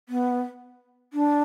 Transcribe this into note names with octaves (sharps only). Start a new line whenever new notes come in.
B3
D4